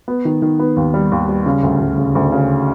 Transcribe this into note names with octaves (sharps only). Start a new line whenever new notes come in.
B3
D#3
D#3
B3
D#2
G3
D#2
G3
C#3
D2
D2
C#3
D2
C#3